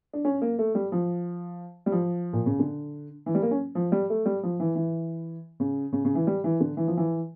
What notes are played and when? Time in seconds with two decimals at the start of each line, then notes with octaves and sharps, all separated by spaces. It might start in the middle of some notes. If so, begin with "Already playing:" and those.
0.13 D4
0.25 C#4
0.42 A#3
0.59 A3
0.75 G3
0.92 F3
1.86 G3
1.92 F3
2.33 A#2
2.46 C#3
2.59 D3
3.26 E3
3.35 G3
3.42 A#3
3.51 C#4
3.75 F3
3.92 G3
4.10 A3
4.26 G3
4.43 F3
4.60 E3
4.76 E3
5.60 C#3
5.93 C#3
6.05 C#3
6.15 E3
6.27 G3
6.44 E3
6.60 D3
6.77 E3
6.88 F3
6.97 E3